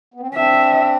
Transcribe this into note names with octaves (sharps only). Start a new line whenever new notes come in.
B3
C4
C#4
C4 D4 E5